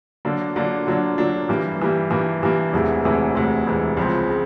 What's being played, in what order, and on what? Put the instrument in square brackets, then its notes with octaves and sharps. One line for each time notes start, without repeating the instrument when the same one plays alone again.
[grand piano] D3 F#3 A#3 D4
D3 F#3 A#3 D4
D3 F#3 A#3 D4
D3 F#3 A#3 D4
G2 E3 G3 A#3
G2 E3 G3 A#3
G2 E3 G3 A#3
G2 E3 G3 A#3
E1 D2 C3 E3 G#3
E1 D2 C3 E3 G#3
E1 D2 C3 E3 G#3
E1 D2 C3 E3 G#3
C#2 C#3 F3 G#3 C4
C#3